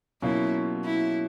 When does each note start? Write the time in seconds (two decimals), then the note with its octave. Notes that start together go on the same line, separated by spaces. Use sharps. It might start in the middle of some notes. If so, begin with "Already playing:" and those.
0.22 B2 F#3 A#3 C#4 E4 F4
0.85 E4